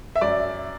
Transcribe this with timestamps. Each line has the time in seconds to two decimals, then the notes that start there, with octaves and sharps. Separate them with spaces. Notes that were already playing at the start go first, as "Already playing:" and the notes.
0.16 E5
0.21 F#2 D5